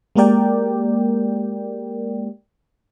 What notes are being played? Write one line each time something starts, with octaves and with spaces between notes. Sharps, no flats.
G#3 A#3 G4 A#4 D5 G5